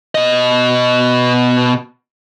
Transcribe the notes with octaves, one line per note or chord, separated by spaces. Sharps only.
B2 D#5